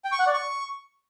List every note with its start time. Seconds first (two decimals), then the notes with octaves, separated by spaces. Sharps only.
0.04 G5
0.12 C#6
0.19 F#5
0.27 D5
0.34 C#6